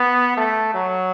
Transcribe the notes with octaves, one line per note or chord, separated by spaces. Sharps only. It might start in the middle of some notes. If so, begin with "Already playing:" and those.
Already playing: B3
A3
F#3